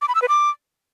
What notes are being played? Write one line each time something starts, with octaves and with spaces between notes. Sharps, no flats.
D6
B5
E6
B4
D6